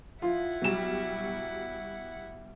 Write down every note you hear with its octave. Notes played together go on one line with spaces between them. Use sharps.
F3 E4 F4 F#5
B2 F#3 G3 E7